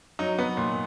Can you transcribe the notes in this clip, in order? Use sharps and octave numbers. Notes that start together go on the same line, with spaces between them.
F#3 D#4
B3
A#2